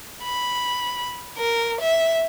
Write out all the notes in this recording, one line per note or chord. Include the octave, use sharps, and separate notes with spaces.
B5
A#4
E5